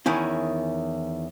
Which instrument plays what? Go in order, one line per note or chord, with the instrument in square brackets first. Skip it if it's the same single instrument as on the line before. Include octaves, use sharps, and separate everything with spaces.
[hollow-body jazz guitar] E2 D#3 C#4 E4